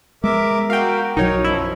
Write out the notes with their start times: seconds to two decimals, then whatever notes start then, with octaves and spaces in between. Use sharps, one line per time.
0.24 G#3 B3 A#4 E5 D6
0.70 F#4 A#4 F5 G5
1.17 B1 F#3 D#4 A#4 C#5
1.44 F#2 F3 E4